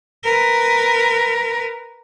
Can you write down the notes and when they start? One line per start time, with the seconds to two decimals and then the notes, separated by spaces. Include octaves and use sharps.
0.24 A#4 B4